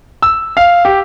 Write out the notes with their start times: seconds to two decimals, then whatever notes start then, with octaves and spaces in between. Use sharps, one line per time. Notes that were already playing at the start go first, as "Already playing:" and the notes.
0.22 E6
0.57 F5
0.85 G4